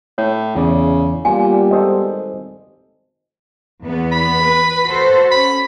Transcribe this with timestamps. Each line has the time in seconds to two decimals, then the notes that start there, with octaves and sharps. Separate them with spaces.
0.18 A2 C#5
0.56 E2 C#3 D5
1.25 A#2 G3 B3 F4 G#5
1.71 G#1 A4 C5 D#5
3.83 E2 B3
4.12 B5
4.42 B4
4.86 F#4 A4 C5
5.32 C#4 B5